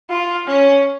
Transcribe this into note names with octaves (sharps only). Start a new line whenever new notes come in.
F4
C#4